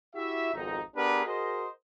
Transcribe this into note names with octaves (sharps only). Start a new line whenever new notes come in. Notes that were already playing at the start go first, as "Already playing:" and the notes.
E4 F#4 G4 E5
G#1 F2 B2 D#4
B3 D4 G4 G#4 A#4 B4
F#4 G#4 A#4 C5 D#5